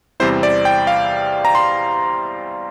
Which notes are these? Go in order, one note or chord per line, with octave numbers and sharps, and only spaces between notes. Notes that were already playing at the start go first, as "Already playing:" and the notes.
E2 C3 G3 C4 E4 C5
D5
G5
F5
A#5
C6